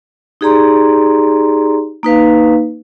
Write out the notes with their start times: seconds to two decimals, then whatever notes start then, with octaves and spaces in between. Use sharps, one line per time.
0.41 D#4 G4 G#4 D5 A#5 C6
2.03 A#3 D#4 B4 F5